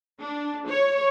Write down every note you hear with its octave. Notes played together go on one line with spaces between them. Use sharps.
D4
C#5